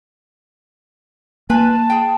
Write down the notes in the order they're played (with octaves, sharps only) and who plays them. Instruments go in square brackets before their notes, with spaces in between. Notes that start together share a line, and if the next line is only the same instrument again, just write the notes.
[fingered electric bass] A#3 [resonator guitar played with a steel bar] F4 B4 G#5 [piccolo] A5
[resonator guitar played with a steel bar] G#4 G5